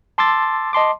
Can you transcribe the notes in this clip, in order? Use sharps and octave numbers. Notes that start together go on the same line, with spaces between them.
A5 C6 D6 E6 A6
D#5 A5 C6 D6